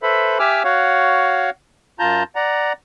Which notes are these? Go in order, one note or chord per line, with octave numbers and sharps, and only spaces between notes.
A4 B4 C5 E5 B5
G4 E5 G#5 D6 E6 F6
F#4 C#5 F5 F#5
F#2 F4 A5 A#5 G6
D5 F#5 A#5